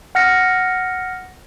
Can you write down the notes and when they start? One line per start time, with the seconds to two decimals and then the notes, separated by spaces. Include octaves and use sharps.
0.15 F#5 F6 A#6 C#7